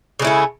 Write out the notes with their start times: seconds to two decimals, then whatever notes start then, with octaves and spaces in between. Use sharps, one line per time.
0.19 C#3
0.22 G#3
0.25 E4
0.27 A3